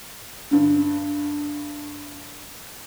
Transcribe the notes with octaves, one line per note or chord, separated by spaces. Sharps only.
G2 D3